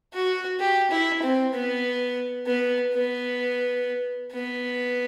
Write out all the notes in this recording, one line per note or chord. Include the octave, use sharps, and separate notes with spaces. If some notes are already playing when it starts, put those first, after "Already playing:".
F#4
G4
E4
C4
B3
B3
B3
B3